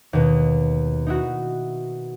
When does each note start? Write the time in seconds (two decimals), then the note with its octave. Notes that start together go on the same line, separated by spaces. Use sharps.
0.13 D#2 B2
1.06 D#4 E4 F#4